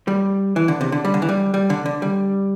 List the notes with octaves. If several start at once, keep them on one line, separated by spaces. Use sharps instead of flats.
G3
E3
D3
C3
D3
G3
D3
E3
G3
G3
D3
D3
G3